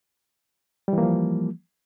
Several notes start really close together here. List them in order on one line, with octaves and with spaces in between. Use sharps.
G3 E3 A#3 F3